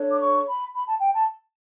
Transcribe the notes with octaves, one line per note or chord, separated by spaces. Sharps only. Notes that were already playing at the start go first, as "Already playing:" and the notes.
Already playing: D4 A4 C#5
D6
C#6
B5
B5
A5
G5
A5